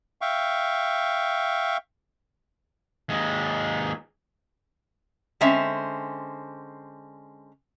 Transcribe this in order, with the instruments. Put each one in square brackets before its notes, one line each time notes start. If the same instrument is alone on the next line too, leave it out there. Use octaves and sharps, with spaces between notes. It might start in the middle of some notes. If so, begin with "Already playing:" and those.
[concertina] E5 F5 G5 C#6
[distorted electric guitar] D#2 G#3
[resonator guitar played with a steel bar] D3 G#3 C4 C#4 E5